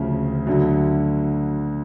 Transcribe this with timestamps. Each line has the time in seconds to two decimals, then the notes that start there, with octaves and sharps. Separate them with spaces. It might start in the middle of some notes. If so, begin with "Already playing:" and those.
Already playing: D2 C#3 F3
0.47 D2 D3 F#3